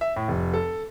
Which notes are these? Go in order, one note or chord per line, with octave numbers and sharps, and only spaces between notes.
E5
A2
F1
A4